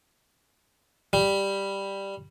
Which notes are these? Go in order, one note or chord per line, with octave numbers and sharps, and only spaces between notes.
G3